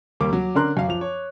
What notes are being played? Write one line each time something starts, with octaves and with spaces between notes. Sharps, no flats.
D#2 G3 A#3 D6
F#3
D3 C#4 D4 A#4 C6 F#6
F#2 F5
F3 F7
C#5